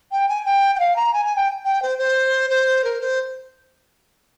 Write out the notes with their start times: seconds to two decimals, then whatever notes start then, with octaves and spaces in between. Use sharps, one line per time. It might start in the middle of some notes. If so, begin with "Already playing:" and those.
0.11 G5
0.28 G#5
0.45 G5
0.75 G5
0.79 F5
0.96 A#5
1.13 G#5
1.25 G#5
1.36 G5
1.65 G5
1.82 C5
1.98 C5
2.50 C5
2.84 A#4
3.01 C5